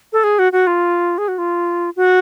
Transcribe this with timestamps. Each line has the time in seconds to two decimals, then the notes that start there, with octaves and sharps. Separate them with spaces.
0.13 A4
0.24 G#4
0.39 F#4
0.52 F#4
0.67 F4
1.18 G#4
1.28 F#4
1.38 F4
1.96 F#4